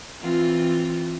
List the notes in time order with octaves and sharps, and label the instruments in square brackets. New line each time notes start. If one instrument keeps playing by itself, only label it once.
[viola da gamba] E3 C4 F4